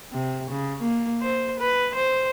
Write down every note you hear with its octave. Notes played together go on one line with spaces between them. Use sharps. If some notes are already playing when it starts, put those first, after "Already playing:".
C3
C#3
A#3
C5
B4
C5